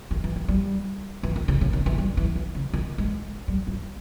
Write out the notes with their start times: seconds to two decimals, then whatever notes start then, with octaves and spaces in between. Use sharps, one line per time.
0.11 D#3
0.24 E3
0.36 E3
0.48 G3
1.23 E3
1.36 D#3
1.48 C#3
1.61 C#3
1.73 D#3
1.86 E3
1.98 G3
2.17 E3
2.35 E3
2.55 C#3
2.73 D#3
2.98 G#3
3.48 G3
3.67 E3